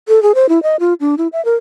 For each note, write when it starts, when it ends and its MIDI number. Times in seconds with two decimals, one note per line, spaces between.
0.08 0.22 69
0.23 0.32 68
0.35 0.49 72
0.49 0.62 64
0.63 0.76 75
0.80 0.94 65
1.00 1.15 62
1.18 1.28 64
1.33 1.43 76
1.45 1.55 70